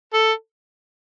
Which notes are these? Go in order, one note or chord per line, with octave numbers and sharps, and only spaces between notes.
A4